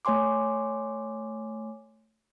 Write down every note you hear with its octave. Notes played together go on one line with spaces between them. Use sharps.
A3 C#5 G#5 C6 D6